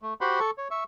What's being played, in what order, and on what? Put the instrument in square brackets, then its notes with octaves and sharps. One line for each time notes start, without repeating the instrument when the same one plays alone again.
[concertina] A3
F#4 G4 C5 F#5 B5 C6
A4 C#6
C#5
E5 C#6